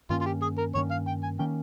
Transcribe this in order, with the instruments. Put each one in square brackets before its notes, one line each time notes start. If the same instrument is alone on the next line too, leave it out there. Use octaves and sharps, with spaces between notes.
[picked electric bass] G2 D#3 A#3 C#4 [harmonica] F4
[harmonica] F4
G4
G#4
A#4
[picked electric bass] G2 D#3 A#3 C#4 [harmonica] C#5
[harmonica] F5
G5
G#5
[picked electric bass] D#3 A#3 C#4 [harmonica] G5